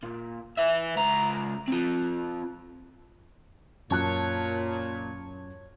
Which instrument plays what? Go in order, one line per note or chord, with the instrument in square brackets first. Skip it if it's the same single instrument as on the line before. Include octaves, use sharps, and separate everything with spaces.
[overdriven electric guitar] A#2
B4 E5
C#2 A#5
C4 F4
[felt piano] F#2 A5 F#6 [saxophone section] A#2 [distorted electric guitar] C#5